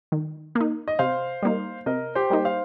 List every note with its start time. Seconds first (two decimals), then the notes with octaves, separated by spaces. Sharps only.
0.12 D#3
0.55 A#3
0.60 D#4
0.88 D#5
0.99 C3 C5 F5
1.42 G3 A#3 D#4
1.86 C3 A#4 D#5
2.15 G4 C5
2.30 G3 A#3 D#4
2.45 C5 F5